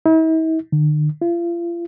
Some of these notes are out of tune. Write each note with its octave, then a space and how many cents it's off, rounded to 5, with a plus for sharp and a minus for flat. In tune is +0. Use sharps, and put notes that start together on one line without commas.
E4 -45
D3 +45
F4 -35